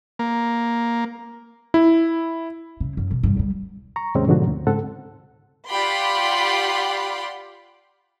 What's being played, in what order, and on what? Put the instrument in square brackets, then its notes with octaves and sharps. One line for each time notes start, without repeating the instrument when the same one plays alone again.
[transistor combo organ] A#3
[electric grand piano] E4
[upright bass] C#3
F#2
B2 D#3
G2 B2
D3 G3
[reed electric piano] A#5 C#6
D#2 G#2 C3 G#3 C4 C#4
G#2 B2 D3 F3 C4 F#4
D2
G#2 C#3 C4 A4 F#5
[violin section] F4 G4 D5 F#5 B5 C6